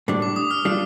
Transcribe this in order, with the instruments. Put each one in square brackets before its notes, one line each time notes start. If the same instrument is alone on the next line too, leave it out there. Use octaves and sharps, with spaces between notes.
[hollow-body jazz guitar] A2 G3 D4
[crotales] D6
D#6
F6
[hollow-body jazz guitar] G3 D4 F4